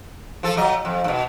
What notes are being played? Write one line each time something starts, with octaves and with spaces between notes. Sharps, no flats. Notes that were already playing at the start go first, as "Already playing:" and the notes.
F3 A4
F#3 D#5
F2
G2 B2